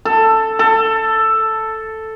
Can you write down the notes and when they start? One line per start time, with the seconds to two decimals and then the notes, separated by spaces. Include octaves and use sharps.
0.05 A4
0.59 A4